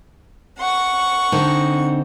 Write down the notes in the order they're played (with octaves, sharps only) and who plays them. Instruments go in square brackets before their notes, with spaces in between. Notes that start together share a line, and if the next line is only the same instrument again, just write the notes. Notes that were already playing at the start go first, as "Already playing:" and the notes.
[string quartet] F#5 C#6
[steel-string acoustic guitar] D3 C4 D#4